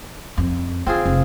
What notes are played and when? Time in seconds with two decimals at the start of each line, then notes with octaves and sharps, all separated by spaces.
0.38 F2
0.87 D3 C4 F4 G#4
1.06 F1